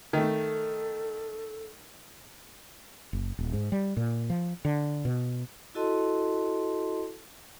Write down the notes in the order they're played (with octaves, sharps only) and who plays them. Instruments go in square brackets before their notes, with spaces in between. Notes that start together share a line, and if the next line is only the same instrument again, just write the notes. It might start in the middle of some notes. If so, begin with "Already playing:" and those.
[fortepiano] D#3 A3 [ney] A4
[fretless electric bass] F#1
D#1
G#2
G3
A#2
F3
D3
B2
[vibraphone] E4 F#4 A4 D#5 A5 C6